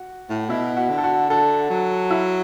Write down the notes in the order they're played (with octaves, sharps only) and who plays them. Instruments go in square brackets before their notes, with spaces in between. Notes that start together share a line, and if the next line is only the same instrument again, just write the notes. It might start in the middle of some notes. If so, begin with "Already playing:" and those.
Already playing: [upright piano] F#4
[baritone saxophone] A2
[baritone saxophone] B2 [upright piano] E4
[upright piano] F#4
[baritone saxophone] D3
[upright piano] A4
F#4
[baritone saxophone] D3 [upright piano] A4
[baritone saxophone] F#3
[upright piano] E4